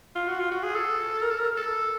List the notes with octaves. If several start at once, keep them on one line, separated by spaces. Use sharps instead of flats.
F4
F#4
F4
F#4
G#4
A4
A#4
A4
A#4
A4